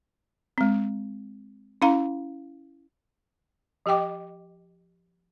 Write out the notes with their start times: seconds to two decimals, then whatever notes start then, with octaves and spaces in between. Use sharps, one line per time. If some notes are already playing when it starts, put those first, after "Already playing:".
0.58 G#3 C4
1.82 C#4 E4 F5 A#5
3.86 F3 G4 D#5 G5 D6